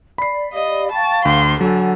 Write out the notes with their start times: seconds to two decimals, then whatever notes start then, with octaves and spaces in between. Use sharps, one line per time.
0.18 D5 B5 C7
0.53 G4 D5 D#5 F5
0.92 F5 G5 A5 C#6
1.25 D2 C6
1.61 D3 F#3 F#5 G#5